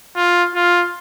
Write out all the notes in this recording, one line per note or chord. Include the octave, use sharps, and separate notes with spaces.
F4
F4